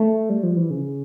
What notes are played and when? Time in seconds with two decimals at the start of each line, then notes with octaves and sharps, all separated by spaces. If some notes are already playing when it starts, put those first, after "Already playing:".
Already playing: A3
0.30 G3
0.43 F3
0.57 E3
0.70 C#3